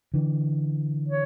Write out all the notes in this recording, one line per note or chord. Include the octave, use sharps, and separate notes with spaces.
D3 E3
C#5